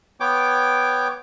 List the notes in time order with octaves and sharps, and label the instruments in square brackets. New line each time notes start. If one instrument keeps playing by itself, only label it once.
[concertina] B3 C#5 G5 D6